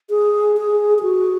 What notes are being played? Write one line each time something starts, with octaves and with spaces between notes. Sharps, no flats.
G#4
G#4
G#4
F#4